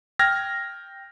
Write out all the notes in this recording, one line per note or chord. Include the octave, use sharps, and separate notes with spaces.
G5 F6 G#6 A#6